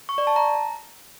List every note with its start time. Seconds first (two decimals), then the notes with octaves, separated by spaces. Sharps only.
0.09 C#6
0.18 D5
0.27 A5
0.36 A#5